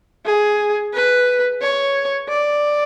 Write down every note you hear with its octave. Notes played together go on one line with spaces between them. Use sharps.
G#4
B4
C#5
D5